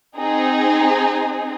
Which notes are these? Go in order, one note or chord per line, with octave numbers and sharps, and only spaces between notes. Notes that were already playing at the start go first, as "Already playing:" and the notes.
C4 D#4 G#4